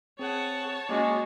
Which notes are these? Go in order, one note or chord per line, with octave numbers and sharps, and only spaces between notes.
C4 G#4 C#5 F#5 A5
G#3 A#3 C#4 F#4 C#6 D6